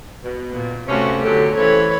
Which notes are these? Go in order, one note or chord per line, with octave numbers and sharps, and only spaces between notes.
B2
A#2
G2 C3 A3 C#4 F#4
G#2 B2 D3 F#3 G4 A4
G2 C#3 E3 C4 B4 C#5